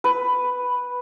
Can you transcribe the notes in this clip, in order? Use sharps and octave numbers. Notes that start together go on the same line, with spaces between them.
B4